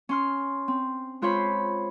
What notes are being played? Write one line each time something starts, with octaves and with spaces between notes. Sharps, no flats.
C#4 C6 F6
C4
G#3 F4 C5 C#5 B5